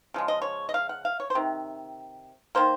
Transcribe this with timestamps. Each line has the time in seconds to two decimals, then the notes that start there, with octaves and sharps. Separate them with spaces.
0.14 C#3 F3 G#3
0.28 D#5
0.42 C#5
0.69 D#5
0.74 F5
0.89 F#5
1.05 F5
1.20 C#5
1.30 C5
1.35 C3 D#3
2.55 D#3 A#3 C5